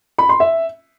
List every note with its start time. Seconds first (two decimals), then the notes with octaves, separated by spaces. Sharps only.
0.19 B5
0.29 C6
0.40 E5